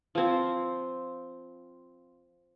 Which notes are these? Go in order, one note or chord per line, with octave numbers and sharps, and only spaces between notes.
F3 C4